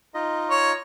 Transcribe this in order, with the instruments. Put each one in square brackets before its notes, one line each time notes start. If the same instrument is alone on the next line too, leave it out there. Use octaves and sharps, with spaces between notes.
[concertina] D#4 F4 D#5
[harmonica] C#5